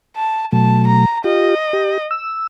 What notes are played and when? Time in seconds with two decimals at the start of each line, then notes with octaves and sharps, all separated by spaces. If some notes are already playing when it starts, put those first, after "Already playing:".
0.16 A5
0.52 B2 F#3 A3 A5
0.87 A#5
1.24 F4 G4 D#5
1.73 G4
2.11 E6